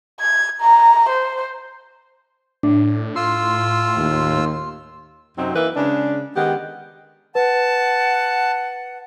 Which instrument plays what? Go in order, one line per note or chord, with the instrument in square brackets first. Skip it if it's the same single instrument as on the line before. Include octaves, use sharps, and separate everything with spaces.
[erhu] G#6
A#5
C5
[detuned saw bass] A2 [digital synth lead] D4
[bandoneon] F4 E6 [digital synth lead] C6
[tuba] D#2
[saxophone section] F#2 C3 F#3 C4 D#4
E3 A#3 A#4 B4 E5
C#3 G#3 C#4 D4
D#3 G#3 B3 G4 F#5
[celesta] B4 [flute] F#5 [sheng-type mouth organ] A5